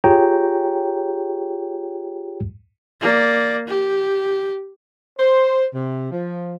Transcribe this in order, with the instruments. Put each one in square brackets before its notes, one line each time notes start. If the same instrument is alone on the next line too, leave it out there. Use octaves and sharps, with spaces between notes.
[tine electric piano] F4 G4 G#4 C#5 G5 A#5
[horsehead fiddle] A#3 D5
G4
[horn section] C5
C3
F3